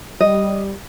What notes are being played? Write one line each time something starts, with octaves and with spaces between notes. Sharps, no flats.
G3 D#5